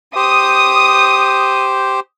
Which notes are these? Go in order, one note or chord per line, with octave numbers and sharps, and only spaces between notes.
G4 C5 D#6